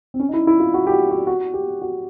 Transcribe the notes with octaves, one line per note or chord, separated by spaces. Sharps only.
C4
C#4
D#4
E4
E4
F4
F#4
G4
F#4
F#4
F#4
G4
F#4